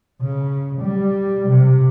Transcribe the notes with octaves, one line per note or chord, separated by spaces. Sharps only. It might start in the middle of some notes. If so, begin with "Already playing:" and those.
C#3
G3
C3